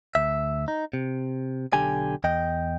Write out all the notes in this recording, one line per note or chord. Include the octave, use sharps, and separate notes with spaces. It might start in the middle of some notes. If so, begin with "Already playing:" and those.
D2 E5
D#4
C3
B1 D3 G4 G#5
E2 D#5 G5